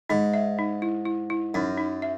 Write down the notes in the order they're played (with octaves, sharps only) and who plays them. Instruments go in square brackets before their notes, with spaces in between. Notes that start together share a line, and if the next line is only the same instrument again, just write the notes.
[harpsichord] G#2 [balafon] D#4
[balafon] E5
D#4
E4
E4
E4
[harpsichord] F#2 [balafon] D#4
[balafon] D#4
E5